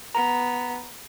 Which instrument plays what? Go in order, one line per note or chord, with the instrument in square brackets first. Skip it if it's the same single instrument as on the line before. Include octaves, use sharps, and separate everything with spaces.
[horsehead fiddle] B3 [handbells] A#5